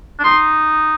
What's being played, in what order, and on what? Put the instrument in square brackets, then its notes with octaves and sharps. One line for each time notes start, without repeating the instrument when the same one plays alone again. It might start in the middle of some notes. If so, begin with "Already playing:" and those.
[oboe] D4
[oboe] D#4 [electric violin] C6